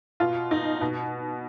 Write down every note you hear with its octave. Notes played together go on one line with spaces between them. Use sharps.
B2 F4
D#4
B2